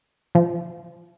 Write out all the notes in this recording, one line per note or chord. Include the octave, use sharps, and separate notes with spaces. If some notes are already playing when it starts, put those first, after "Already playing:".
F3